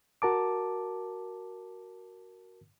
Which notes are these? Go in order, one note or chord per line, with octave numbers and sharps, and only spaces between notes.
F#4 A#4 A5 D6